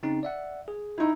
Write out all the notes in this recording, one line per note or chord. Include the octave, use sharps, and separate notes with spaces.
C#3 C4 D#4
D5 E5 F#5
G#4
D#4 E4